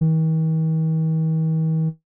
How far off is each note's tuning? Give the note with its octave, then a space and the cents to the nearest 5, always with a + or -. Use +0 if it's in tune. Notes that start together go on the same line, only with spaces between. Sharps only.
D#3 +45